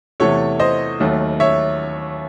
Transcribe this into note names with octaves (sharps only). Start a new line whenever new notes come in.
E2 C3 E3 A3 A4 C#5
C5 D#5
D#2 D#3 F#3 A3
C#5 E5